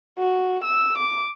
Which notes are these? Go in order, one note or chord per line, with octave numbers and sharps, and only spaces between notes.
F#4
E6
D6